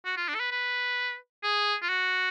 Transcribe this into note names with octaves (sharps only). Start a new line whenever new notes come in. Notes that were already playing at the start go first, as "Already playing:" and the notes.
F#4
F4
D4
A4
B4
B4
G#4
F4
F#4